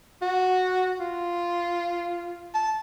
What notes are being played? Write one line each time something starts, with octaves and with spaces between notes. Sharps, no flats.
F#4
F4
A5